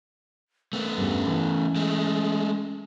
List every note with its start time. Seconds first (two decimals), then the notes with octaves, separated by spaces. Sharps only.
0.73 A3 B3 A#4
0.97 E2 G2 C#4
1.27 E3
1.76 G#3 A3